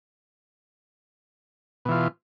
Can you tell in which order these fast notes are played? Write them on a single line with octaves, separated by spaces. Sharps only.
B2 E3 F4